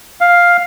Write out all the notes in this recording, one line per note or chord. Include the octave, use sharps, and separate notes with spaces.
F5